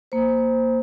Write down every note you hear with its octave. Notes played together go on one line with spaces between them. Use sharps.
A#3 C5